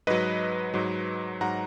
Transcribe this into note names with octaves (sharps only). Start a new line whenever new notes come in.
G#2 F#3 B4 D#5
G#2 F#3
G#2 F#3 F#5 A#5